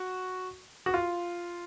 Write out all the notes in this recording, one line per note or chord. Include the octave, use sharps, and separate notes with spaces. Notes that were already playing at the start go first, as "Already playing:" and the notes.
Already playing: F#4
F#4
F4